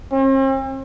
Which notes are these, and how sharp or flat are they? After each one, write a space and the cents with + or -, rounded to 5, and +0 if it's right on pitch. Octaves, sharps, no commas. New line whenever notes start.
C4 +45